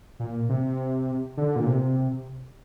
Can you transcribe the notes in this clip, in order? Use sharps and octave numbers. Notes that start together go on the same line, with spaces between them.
A#2
C3
D3
A#2
C3